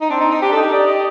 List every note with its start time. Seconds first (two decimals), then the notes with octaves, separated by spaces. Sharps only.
0.01 D#4
0.10 C4 D4
0.20 D#4
0.31 D#4
0.42 D4 G4
0.52 A4
0.57 D#4
0.63 G4
0.73 D5
0.87 D#5